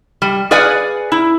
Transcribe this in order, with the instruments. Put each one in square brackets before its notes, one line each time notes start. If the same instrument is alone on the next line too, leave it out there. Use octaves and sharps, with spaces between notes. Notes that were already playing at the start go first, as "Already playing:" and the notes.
[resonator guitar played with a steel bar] G3
G#4 B4 D5 F5 F#5 G#5
E4